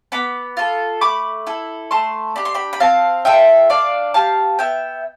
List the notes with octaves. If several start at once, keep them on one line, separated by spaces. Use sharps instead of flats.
B3 B5 D6
F4 A4
A3 B5 D6
E4 A4
A3 A5 C6
D4 G4 B5
C6
G5 B5
B5
C4 F5 A5
F4 A4 E5 G5
D4 D5 F5
G4 F5 A5
B3 E5 G5